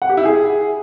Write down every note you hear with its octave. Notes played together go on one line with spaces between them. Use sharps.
F#5
G4
E4
G#4